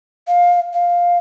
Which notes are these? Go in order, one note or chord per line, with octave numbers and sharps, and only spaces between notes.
F5
F5